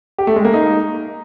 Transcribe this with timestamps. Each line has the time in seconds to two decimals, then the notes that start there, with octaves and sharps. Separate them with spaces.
0.18 G4
0.27 A3
0.36 G#3
0.45 A#3
0.53 D#4